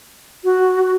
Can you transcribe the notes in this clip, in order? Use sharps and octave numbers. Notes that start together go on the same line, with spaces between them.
F#4